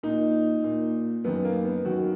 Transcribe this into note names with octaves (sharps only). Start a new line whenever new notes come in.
A#2 D#4
A#2
F#2 D#3 B3
A#3
B3
F#2 D#3 F#4